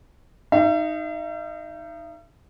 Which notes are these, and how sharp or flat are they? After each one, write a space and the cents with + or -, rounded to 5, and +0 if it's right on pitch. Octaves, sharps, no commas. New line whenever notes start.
D#4 +0 E5 +45